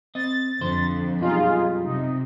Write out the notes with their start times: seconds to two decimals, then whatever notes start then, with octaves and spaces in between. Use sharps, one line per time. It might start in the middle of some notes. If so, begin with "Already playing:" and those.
0.15 C4 D#5 A6
0.61 F2 D3 F3 C5
1.20 F#2 B2 G3 D#4 F4 G#4
1.84 C3 D#4